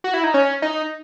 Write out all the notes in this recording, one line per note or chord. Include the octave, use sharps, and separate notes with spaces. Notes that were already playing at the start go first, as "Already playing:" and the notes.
F#4
E4
D#4
C#4
D#4